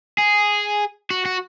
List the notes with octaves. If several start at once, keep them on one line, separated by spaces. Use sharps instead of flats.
G#4
F#4
F#4